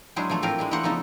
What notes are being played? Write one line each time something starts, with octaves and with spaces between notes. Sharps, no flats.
F#3 G#3 D4 E4 G#4 C5
E3 F3 A3 A4
A2 C4 F4 G4 A#4 F5
G#3 D4 E4
E3 A3 A#3 A#4 C5 F#5
C#3 F3 B3 D#4 A4